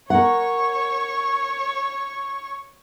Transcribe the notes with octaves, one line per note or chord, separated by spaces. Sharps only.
A#4 C#5 F#5 C#6